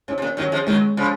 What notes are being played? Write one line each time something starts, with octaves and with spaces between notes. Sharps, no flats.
G#2 C#4
C3
A#2
D#3 F#3 C#4
F3 G#3
D#3 F#3 G#3
C#3 F3